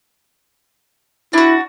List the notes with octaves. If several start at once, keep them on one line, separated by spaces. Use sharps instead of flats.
D4 E4 F#4